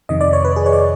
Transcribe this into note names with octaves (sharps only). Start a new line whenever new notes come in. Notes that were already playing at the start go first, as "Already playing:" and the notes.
F2 C3 D#3 D#5
D5
C#5
B4
G#4
C#5
D5